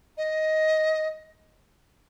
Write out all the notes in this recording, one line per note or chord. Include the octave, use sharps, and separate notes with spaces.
D#5